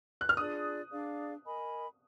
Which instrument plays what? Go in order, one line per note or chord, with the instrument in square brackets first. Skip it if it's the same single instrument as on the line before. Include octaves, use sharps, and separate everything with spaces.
[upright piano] F#6
F6
[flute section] D4 F4 G#4 D5 [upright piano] D#6
[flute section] D4 G#4 D5 F5
A#4 D#5 G#5 B5